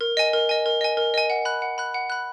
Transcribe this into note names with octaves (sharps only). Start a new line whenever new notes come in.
A#4
D#5 G#5
A#4
D#5 G#5
A#4
D#5 G#5
A#4
D#5 G#5
F#5
B5 F#6
F#5
B5 F#6
F#5
B5 F#6